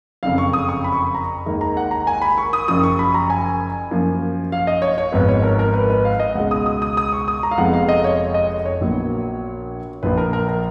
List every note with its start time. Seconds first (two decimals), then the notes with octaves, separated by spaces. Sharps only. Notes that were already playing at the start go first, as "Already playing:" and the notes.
0.23 F#1 F2 C#3 F5
0.38 C#6
0.53 D#6
0.69 C#6
0.84 B5
0.92 C#6
1.01 B5
1.14 A#5
1.46 D#2 D#3 G#3
1.61 A#5
1.77 F#5
1.91 A#5
2.07 G#5
2.22 B5
2.38 C#6
2.53 D#6
2.68 F#1 F#2 F3 D#6
2.83 C#6
2.99 B5
3.14 A#5
3.30 G#5
3.91 F#2 F3 A#3
4.52 F5
4.67 D#5
4.82 C#5
4.98 C#5
5.12 G#1 G#2 F3 B3 B4
5.29 C#5
5.43 A#4
5.59 A#4
5.74 B4
5.90 B4
6.05 F5
6.20 D#5
6.35 C#2 B2 G#3 F#5
6.51 D#6
6.66 D#6
6.82 D#6
6.97 D#6
7.13 C#6
7.28 D#6
7.43 A#5
7.51 F5
7.58 F1 F2 F3 G#3 B3 F#5
7.73 F5
7.89 D#5
8.04 C#5
8.34 D#5
8.65 C#5
8.80 A#1 A#2 F#3 B3
10.03 A#1 A#2 F3 B4
10.18 A#4
10.33 A#4
10.49 A#4